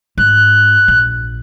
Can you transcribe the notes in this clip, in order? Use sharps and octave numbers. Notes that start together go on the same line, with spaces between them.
G#2 F#6
A#1